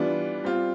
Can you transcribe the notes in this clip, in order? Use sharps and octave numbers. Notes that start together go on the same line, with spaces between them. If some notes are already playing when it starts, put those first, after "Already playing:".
Already playing: E3 G3 B3 D4 F4
G3 C4 F4